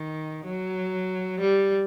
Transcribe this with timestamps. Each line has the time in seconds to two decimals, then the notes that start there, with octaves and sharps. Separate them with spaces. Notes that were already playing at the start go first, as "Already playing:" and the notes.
Already playing: D#3
0.46 F#3
1.40 G3